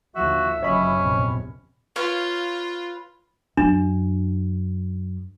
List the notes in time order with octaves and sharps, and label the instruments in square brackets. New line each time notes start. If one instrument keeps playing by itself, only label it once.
[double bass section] D#2 D3 F3 [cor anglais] F#4 [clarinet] E5
[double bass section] F#1 [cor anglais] C#4 [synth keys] C#5 D#5 B5
[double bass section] A#1 E2 C3
[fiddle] F4 [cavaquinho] B4 C#5 F5
[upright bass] F#2 [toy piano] D4